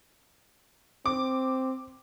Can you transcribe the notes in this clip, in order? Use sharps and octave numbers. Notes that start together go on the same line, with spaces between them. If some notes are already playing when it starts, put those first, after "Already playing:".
C4 D6